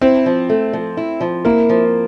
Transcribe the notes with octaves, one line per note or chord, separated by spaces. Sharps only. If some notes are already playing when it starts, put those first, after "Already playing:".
C4 E4
F3
A3
F3
E4
F3
A#3 E4
F3